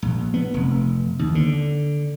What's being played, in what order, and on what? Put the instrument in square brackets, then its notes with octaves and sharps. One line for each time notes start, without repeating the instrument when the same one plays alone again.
[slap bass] A#1
B3
F1
D#2
D3